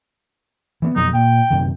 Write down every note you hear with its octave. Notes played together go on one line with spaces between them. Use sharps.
E3 A#3 B3
F2 B2 F#3 D#4
A#2 G5
F#2 C3 D#3